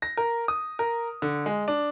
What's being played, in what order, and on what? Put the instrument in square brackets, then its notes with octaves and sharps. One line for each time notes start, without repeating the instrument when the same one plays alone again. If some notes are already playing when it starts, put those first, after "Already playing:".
[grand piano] A#6
A#4
D#6
A#4
D3
G#3
D4